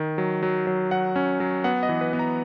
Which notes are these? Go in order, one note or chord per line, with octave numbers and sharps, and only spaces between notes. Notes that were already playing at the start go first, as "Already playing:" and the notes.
Already playing: D#3
F#3
F#3
F#3
F#3 F#5
C#4
F#3
B3 F#5
D#5
E3
B4
B3
A#5